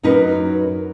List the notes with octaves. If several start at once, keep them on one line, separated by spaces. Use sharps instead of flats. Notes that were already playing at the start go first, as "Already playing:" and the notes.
F#2 F#3 D#4 A#4 B4